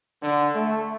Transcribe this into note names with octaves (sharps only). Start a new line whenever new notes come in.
D3
A3